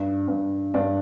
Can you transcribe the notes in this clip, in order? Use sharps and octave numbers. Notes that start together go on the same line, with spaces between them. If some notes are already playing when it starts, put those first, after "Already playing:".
Already playing: G2
G2
G2 D4